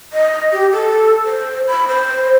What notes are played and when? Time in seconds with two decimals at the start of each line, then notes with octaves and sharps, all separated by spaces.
0.13 D#5
0.53 G4
0.73 A4
1.25 C5
1.68 B5
1.88 C5